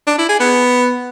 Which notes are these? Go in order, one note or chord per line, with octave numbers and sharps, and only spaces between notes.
D4
E4
G#4
B3